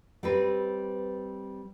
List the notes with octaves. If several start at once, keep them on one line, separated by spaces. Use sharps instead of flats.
G3 C4 B4